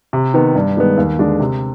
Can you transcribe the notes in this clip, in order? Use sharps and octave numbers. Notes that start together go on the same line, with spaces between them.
C3
D#3 B3
G2
D#3 G#3 B3
D#2
D3 G#3 D4
C3